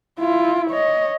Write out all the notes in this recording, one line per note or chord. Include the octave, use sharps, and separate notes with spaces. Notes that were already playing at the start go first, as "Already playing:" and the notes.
E4 F4
C#5 D#5